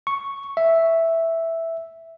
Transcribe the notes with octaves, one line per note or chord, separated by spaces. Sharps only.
C#6
E5